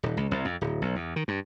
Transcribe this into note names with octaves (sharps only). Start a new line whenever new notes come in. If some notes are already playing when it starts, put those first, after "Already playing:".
D#1
C#2
C2
F2
D1
B1
E2
D#3
G2